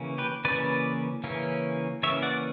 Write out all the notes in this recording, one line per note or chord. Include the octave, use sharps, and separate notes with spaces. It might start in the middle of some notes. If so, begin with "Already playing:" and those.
Already playing: C#3 E3 A#3 C#4
G4 B4
C#3 E3 A#3 C#4 B4 D5
C#3 E3 A#3 C#4
C#3 E3 A#3 C#4 C#5 E5
D5 F#5